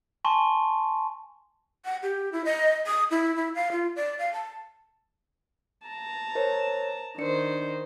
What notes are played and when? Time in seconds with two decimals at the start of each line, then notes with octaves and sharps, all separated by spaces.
0.25 G#5 A5 C6 C#6
1.85 F#5
2.03 G4
2.33 E4
2.45 D#5
2.87 D#6
3.11 E4
3.36 E4
3.55 F5
3.72 F4
3.96 D5
4.19 F5
4.33 A5
5.87 A5 A#5
6.35 A#4 C5 C#5
7.18 D#3 D4 C5 D5 C#7